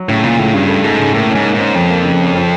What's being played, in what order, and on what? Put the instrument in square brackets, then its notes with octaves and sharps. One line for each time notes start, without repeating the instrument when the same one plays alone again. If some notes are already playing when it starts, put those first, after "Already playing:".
Already playing: [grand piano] F#3
[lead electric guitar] A2 [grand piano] C#3
[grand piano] C#2 [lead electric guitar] A#2
[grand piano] C#2 [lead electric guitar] A2
[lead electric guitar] G2 [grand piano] C#3
[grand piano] A3
[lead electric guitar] G#2 [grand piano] A3
[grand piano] C#3
[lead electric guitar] A2 [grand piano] A#3
[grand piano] C#4
[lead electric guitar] G#2
[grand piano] A#3
[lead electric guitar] G#2 [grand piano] C#4
[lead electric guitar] F2 [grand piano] F3
[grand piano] A#3
C#3
C#4
C4